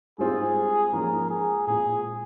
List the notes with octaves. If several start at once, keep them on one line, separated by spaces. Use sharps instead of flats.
G#2 G3 C4 F4 G#4
G#2 F3 A#3 C#4 F4 A#4
G#4
A#2 G#3 C4 F4 G#4